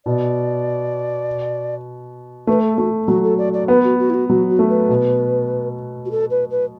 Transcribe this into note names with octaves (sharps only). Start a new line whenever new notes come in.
B2 D5
A3 B4
A4
A3 F#4
F#3 F#4
A4
D5
D5
B3 B4
F#4
F#4
E4
F#4
F#3 F#4
F#4
A3
B4
B2
F#4
A4
B4
B4